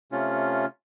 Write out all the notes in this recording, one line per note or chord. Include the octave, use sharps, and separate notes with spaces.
C3 A3 C#4 F4